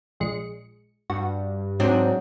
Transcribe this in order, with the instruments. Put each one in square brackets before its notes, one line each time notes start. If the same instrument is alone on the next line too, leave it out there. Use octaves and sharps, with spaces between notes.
[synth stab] A#1 G#3 C#7
[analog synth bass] G2 [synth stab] F#4
[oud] G#2 C4 D4 [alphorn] F#3